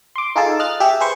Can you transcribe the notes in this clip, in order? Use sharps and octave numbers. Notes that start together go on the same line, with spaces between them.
C6 D6
D#4 F4 G#4 A4 A5
D#5 F6 F#6 A6
G4 G#4 E5
G#4 B4 C5 C#6